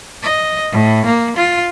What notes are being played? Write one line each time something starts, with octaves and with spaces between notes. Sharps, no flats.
D#5
A2
A#3
F4